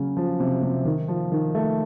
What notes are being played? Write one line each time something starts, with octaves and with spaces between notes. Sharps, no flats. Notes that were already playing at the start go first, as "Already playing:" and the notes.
Already playing: C#3 F#3
F3
C3
C3
D#3
F3
D#3
A3